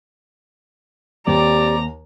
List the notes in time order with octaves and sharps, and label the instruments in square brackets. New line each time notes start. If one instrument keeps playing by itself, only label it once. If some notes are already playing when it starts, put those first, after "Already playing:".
[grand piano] D#2 [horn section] C4 D5 [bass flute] G4 [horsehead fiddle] A#5